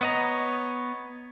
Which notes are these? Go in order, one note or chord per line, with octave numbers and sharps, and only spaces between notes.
B3 C#5 D#5 A#5